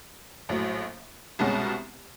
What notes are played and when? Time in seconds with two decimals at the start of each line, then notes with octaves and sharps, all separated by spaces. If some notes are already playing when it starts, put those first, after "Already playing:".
0.49 A#1 A2 F#3
1.39 C2 B2 G#3 C#4 F#4